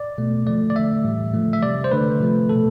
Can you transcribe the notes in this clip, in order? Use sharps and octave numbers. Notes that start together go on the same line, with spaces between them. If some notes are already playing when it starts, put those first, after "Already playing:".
Already playing: D5
B2 A3
D3 F3 A3 D5
D5
D3 A3 E5
A2 E3 G3
D3 F3 A3
E5
C3 G3 D5
C5
D3 A3 B4
C3 F3 A3
B2 A3 A4